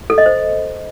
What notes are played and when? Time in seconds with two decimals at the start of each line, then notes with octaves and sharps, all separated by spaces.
0.10 A4
0.18 D#5
0.26 C5